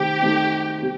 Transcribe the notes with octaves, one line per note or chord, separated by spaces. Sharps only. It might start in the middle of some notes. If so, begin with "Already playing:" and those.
Already playing: C3 D#3 A3 C4 D#4 G4
C3 D#3 A3 C4 D#4
C3 G3